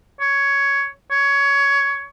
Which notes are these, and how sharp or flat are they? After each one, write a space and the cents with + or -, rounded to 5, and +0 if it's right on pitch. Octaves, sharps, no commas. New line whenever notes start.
C#5 +10
C#5 +15